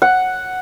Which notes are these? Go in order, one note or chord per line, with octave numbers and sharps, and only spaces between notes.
F#5